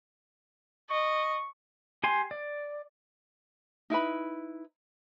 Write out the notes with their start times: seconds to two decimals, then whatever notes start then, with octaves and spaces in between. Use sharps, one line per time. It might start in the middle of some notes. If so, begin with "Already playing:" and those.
0.90 D#5 C#6
2.04 G4 G#5 C6
2.31 D5
3.90 D#4 E4 B4 B5